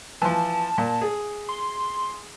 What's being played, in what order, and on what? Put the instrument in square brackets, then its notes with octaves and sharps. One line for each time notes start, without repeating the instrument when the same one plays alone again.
[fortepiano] E3 F3 [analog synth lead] A5
[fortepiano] A#2
G#4
[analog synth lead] C6